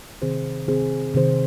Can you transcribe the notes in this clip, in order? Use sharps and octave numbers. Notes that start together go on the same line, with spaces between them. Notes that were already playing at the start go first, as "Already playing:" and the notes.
C3 D#3 C4 G#4 C5
C3 D#3 C4 G#4 C5
C3 D#3 C4 G#4 C5